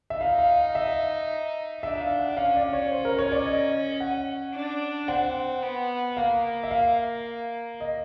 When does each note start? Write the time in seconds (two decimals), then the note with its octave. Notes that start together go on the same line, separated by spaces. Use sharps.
0.10 E5
0.20 D#4 F5
0.38 F5
0.75 E5
1.83 D4 E5
2.01 F5
2.19 F#5
2.37 C#4 F5
2.56 D5
2.73 C#5
2.92 C5
3.05 A#4
3.19 C#5
3.32 D5
3.46 D#5
4.00 F#5
4.54 D4
5.08 C4 F#5
5.63 B3
6.17 A#3 F5
6.63 E5
6.71 F5
7.81 D#5